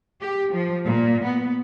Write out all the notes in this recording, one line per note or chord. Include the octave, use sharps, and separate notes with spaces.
G4
F3
A#2
B3